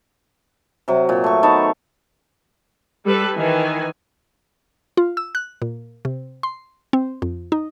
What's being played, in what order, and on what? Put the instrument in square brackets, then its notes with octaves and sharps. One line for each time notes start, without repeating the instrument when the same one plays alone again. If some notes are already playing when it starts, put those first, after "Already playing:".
[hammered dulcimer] C3 F#3
A#2
A3 C#6
D#3 B3 A5 C#6
[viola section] G3 A4 B4
D#3 E3 G#5
[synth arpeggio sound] F4
E6
F#6
A#2
C3
C6
C4
F2
D#4